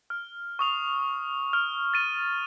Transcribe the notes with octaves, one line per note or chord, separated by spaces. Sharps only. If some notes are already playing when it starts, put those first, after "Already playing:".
F6
C#6 D#6 F7
F6
A6 D#7